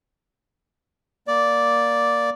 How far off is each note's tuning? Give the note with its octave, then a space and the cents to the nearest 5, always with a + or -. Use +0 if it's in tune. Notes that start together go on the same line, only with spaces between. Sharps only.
A#3 +10 D5 -5